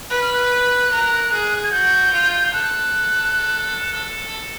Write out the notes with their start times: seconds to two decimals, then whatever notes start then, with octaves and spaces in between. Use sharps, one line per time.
0.10 B4 F#6
0.22 F6
0.33 F#6
0.91 A#4
1.31 G#4
1.63 G#6
1.72 F#4 G6
2.13 F4
2.53 A4 F#6